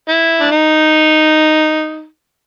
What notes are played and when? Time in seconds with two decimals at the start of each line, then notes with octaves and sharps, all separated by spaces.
0.09 E4
0.41 D4
0.52 D#4